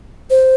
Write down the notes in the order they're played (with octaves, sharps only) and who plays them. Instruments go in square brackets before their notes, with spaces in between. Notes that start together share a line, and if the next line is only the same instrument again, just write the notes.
[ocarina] C5